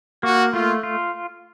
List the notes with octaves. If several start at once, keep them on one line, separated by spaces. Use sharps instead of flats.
A#3 F#4
A3 F4
F4